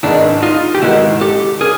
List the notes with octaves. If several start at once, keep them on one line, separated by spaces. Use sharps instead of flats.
G#1 G#2 D#3 G#3 B3 D4 E4
D#4 F4
G4
G#1 G#2 D#3 G#3 B3 E4 F#4
G4 A4
C#3 G#4 A#4